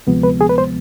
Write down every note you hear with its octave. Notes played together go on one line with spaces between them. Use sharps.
D2 C3 F3 G#3 B3
B4
G#4
B4
C5